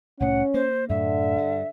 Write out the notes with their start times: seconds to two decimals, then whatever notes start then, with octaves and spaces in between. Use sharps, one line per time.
0.20 C2 A2 C#4 F#5
0.54 A#3 C5
0.89 F#2 A2 D3 E5
1.37 G2